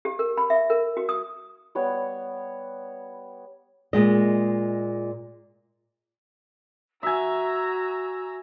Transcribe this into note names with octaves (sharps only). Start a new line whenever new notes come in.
G4
A#4
B5
E5
A#4
F#4
D#6
G3 B3 C#5 F#5
A#2 G#3 D#5
F#4 E5 G#5 A#5 E6